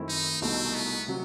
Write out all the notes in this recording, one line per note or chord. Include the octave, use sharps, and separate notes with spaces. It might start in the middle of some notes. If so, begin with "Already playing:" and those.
Already playing: F#2 D#3 A3 C4 E4
D#4
C2 B2 A3 C4 D#4 A4
B3
C3 F#3